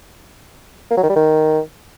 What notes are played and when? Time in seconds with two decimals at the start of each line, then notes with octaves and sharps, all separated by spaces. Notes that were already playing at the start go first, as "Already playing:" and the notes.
0.91 A#3
0.97 F#3
1.03 D#3
1.10 G3
1.16 D#3